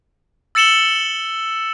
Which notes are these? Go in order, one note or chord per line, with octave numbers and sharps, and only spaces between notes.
E6 A6 C#7 E7 F#7 G7